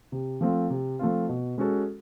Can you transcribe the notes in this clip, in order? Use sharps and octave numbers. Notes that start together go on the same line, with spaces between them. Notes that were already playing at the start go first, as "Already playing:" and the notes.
C3
F3 A3 C4 F4
C3
F3 A3 C4 F4
B2
G#3 C#4 F#4 A4